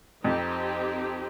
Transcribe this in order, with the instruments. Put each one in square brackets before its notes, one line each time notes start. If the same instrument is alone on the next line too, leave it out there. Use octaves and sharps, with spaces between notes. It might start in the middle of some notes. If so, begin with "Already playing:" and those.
[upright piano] F2 [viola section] C4 D#4 G4